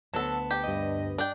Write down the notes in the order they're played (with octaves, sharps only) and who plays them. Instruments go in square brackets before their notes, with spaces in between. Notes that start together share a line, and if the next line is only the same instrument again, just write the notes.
[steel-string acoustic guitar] D2 B3 A5 [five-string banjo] F#3 A4
[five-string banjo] G4
[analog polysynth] G2 D#5
[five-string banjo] D4 G5